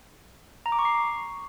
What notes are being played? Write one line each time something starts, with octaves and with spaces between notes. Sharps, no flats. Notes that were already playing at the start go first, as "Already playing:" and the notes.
A#5
D6
C#6
C7